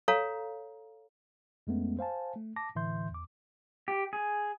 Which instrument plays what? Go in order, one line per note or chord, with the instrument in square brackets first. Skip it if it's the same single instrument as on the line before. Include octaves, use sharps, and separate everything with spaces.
[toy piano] A4 C#5 F5 A#5
[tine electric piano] F2 G#3 A3 B3 C#4
C5 F5 G#5 A5
A3
A5 D6 A#6
A2 D3 E3 E5 C6 G6
E2 D6
[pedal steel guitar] G4
G#4